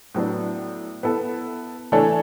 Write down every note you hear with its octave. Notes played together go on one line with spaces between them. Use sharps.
A2 F#3 B3 D4
B3 E4 A4
E3 A3 D4 A4 C#5